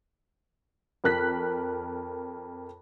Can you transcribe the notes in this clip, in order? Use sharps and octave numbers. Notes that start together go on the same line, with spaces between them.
F2 A#4 F#6 B6